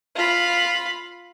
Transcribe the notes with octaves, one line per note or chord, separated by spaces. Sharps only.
F4 B5